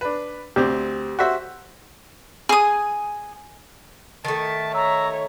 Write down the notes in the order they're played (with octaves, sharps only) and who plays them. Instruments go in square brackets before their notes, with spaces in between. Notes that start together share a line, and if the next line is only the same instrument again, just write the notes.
[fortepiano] D4 B4
[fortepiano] D2 C4 [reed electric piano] G4
[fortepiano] F#4 C5 E5
[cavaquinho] G#4 D#6
[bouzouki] D#3 A3 [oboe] A5
[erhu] C#5 [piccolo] A#5 [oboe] E6